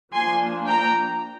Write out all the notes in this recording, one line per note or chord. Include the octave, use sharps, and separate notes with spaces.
F3 A#3 D4 G#5 C6
G5 A#5